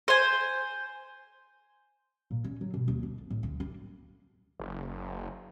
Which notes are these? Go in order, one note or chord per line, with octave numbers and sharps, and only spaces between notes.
C5 G#5
A#2
C#4
F#3
B2
D#2
D4
C2
A2
D2
D4
F#1